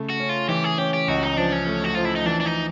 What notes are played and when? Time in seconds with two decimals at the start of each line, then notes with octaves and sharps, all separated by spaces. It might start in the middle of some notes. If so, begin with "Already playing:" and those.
Already playing: C#3 A3
0.10 F#4
0.20 C#4
0.29 F4
0.49 E3 G4
0.64 G#4
0.78 C#4 G4
0.94 G4
1.08 C#2 F#4
1.23 D#4
1.37 F3 D4
1.52 C#4
1.67 A3
1.84 F#4
1.95 F3 F4
2.05 E4
2.16 D#4
2.26 E3 D4
2.40 D4
2.45 D#4